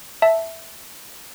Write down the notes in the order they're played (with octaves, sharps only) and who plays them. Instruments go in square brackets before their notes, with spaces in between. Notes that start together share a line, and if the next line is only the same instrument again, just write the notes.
[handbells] E5 A5